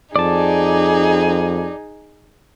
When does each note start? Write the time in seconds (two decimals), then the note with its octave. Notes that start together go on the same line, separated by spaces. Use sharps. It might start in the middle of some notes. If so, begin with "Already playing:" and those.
0.16 F2 D#4 G#4 D5 A5